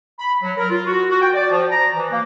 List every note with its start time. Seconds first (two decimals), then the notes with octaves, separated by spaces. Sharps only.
0.18 B5
0.42 F#3
0.57 A#4
0.70 F4
0.86 F#4
1.09 F#4
1.21 G5
1.34 D5
1.50 F3
1.70 A#5
1.95 E3
2.11 A#3